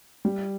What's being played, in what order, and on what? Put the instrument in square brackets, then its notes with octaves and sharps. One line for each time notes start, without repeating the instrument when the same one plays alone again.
[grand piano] G3